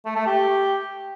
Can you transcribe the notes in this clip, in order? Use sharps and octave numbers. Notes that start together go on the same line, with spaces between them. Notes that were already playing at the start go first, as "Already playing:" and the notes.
A3
A3
G4